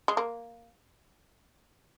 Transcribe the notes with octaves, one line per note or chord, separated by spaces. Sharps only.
G#3
A#3